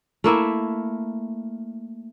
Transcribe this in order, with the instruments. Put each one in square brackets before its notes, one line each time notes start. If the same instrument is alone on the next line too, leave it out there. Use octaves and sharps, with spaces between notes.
[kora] A3 A#3 E4 E5